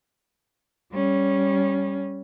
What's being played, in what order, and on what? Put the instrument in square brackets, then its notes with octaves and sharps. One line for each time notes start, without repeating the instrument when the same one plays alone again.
[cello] G3 C#4